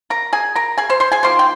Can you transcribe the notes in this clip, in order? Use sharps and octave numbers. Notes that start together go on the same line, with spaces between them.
A#4 A#5
G#4 G#5
A#4 A#5
G#4 G#5
C5 C6
C5 C6
G#4 G#5
D#3 A#3 F4 C5 C6
G5